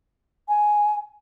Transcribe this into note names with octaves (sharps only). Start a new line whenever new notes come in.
G#5